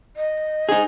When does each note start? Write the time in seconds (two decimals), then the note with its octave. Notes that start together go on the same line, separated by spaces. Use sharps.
0.17 D#5
0.69 D#4 G#4